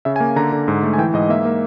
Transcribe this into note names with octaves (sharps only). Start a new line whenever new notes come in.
C#3 E5
G#5
A#3
D3 A#5
D3
G#2
A3
G#5
E3 G5
G#2 D#5
A#3 E5
A#3